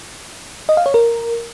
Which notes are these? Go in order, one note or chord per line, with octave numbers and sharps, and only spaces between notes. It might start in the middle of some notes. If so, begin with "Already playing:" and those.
D#5
F5
C#5
A#4